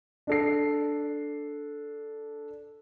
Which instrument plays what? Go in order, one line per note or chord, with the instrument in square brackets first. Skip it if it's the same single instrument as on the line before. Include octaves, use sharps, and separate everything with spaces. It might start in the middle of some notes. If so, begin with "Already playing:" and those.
[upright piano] D4 A4 C7